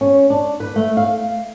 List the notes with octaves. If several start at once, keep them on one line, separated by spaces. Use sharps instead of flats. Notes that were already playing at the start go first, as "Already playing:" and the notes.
C#4
D4
B4
A3
F5